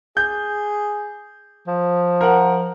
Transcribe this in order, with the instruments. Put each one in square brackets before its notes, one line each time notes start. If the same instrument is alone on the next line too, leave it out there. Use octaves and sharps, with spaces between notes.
[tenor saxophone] G#4 [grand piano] G6
[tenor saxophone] F3
[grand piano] A#4 F#5